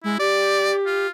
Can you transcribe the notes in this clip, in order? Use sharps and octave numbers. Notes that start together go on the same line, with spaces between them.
G#3 E4
G4 D5
F4